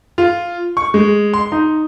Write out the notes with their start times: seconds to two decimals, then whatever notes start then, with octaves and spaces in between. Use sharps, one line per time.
0.18 F4
0.77 C#6
0.94 G#3
1.34 C6
1.52 D#4